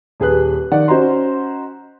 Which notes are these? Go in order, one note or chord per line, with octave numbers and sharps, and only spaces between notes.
D#1 G#4 B4 F#6
D#3 D5 F#5
C#4 F#4 C5 D#5 A#5 C6